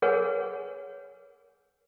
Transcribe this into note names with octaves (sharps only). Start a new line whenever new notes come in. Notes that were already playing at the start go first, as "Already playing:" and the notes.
G#4 A#4 B4 C#5 F#5 G#5